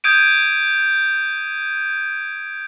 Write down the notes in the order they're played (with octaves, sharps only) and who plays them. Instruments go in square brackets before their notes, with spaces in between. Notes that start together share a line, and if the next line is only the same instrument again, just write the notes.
[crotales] D#6 G6 G#6 D7 D#7